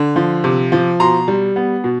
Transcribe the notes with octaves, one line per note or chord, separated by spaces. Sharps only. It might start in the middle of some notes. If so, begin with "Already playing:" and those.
Already playing: D3
F3
C3
F3
B2 A#5 C6
G3
B3
B2